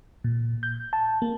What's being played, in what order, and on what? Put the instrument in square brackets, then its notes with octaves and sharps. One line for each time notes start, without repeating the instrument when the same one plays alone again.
[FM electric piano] A#2
G6
A5
A#3